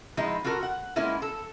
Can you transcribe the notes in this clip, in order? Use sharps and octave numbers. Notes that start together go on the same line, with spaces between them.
F3 G#3 B3 D#4 E4
F4 F#4 A4 A#4
F#5
G#3 A#3 B3 C#4 E4 F4
A4